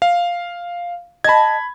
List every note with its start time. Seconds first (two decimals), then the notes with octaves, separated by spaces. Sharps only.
0.02 F5
1.24 D#5 A5 B5 G#6